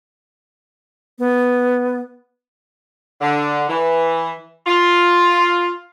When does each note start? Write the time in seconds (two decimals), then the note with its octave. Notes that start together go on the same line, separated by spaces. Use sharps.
1.19 B3
3.21 D3
3.69 E3
4.66 F4